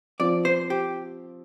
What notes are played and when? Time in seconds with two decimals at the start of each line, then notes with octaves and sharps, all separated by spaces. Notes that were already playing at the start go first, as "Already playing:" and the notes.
0.20 F3 C4 F4 D5
0.45 C5
0.70 G4